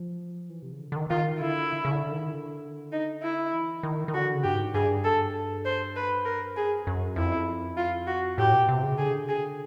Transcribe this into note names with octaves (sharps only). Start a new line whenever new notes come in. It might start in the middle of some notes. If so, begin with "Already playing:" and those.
Already playing: F3
E3
C3
C#3
D3
D3
D#3
D#3 F4
D3 E4
C#3
D3
D#3
D3
D#4
E4
E3
D#3
D#3
D3 F#4
C#3
G2 G4
G#2
G2 G#4
A4
C5
B4
A#4
F#2 G#4
F2
F#2
F2 E4
F4
F#4
A2 G4
B2
C3
C#3
D3 G#4
G#4